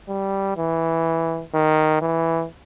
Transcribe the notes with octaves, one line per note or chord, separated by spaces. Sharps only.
G3
E3
D#3
E3